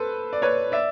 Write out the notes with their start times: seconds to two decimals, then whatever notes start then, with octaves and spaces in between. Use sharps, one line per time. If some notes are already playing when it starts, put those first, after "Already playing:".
Already playing: A4 B4 C5
0.33 D5
0.42 B4 C#5
0.72 D5 E5